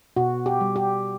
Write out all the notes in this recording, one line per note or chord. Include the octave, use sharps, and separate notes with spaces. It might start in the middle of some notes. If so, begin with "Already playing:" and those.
B2 F#4
G4
G3
G4